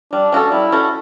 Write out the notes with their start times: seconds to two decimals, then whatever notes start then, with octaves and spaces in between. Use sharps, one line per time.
0.12 G3 D4
0.32 C#4 F#4 A4
0.52 G3 E4
0.72 C#4 F#4 A4